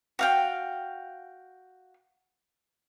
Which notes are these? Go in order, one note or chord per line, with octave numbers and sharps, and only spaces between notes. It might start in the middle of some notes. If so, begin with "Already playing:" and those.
F#4 F5 G5